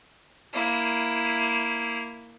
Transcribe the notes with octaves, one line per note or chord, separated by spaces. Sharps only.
A#3 E4